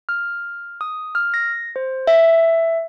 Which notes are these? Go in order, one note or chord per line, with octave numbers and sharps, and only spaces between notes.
F6
D#6
F6
A#6
C5
E5